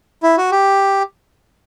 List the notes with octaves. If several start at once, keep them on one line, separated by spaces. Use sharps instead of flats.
E4
F#4
G4